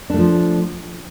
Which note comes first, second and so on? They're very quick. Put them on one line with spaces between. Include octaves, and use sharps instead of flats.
D4 A3 F3